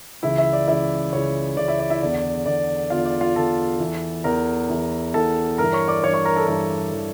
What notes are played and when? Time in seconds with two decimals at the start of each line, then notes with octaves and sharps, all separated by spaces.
0.23 C#2 C#3 E3 E4 E5
0.38 E4 E5
0.53 D5
0.68 C#2 C#3 E3 E4 E5
1.13 C#2 C#3 E3 C#5
1.57 C#2 C#3 E3 D5
1.68 E4 E5
1.79 D5
1.90 E4 E5
2.02 E2 D3 D5
2.46 E2 D3 D5
2.90 E2 D3 F4 F5
3.05 D5
3.20 F4 F5
3.35 E2 D3 A4 A5
3.80 E2 E3
4.24 E2 E3 A#4 A#5
4.69 E2 E3
5.14 E2 E3 A4 A5
5.58 G2 E3 A#4 A#5
5.73 C#5 C#6
5.88 D5 D6
6.03 G2 E3 C#5 C#6
6.14 C#5 C#6
6.25 A#4 A#5
6.36 A4 A5
6.47 G2 E3 A#4 A#5
6.93 E3